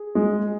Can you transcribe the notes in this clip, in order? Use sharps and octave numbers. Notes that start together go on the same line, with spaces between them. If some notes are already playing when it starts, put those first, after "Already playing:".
Already playing: G#4
G#3